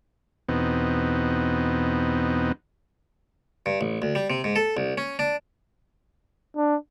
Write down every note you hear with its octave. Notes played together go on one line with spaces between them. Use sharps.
E2 B2 B3 C4 D#4
G2
A1
D2
G3
C3
G#2
A4
C2
C#4
D4
D4